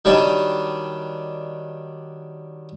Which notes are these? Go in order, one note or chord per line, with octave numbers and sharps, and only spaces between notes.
D#3 F#3 G3 D4